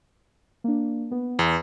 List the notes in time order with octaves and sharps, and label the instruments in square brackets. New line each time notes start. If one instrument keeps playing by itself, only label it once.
[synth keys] A#3 D4
B3
[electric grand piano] E2